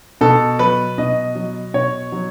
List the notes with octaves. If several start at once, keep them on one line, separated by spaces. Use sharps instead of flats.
B2 A4
F#3 B4
B2 D#5
F#3
B2 C#5
F#3